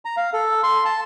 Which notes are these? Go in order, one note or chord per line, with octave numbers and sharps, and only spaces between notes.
A#5
F5
A4
C6
A5